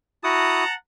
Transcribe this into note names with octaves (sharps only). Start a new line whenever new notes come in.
E4 F#4 F#5 A5 A#5 D#6